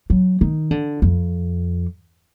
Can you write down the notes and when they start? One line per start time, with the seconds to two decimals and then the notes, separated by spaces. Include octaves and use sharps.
0.10 F#3
0.41 D#3
0.71 D3
1.02 F2